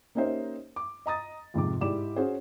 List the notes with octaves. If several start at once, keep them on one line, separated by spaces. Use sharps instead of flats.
A#3 C#4 D#4 G4 C5 E5
D6
D#5 A#5 D#6 A6
F2 G#2 C3 D6
G#2 E4 G4 D5 D6 E7
C#4 F#4 G#4 C5